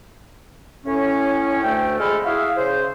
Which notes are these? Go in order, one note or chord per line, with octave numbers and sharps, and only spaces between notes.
A2 C#4
D2 A3 G5
F2 G#3 G#4 A4 B5 F6
E4 F#4 G#4 E5 F5
C#3 C5